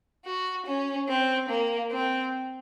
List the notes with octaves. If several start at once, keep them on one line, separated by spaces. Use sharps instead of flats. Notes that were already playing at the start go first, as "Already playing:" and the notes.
F#4
C#4
C4
A#3
C4